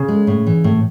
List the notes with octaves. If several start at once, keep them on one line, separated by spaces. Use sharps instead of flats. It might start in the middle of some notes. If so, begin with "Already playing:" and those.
Already playing: C#3
G#3
A2
E3
A2